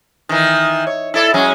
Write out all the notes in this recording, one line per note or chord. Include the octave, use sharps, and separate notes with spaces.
D#3 E3
C#5
E4 A4 D5
F#3 G#3 C#4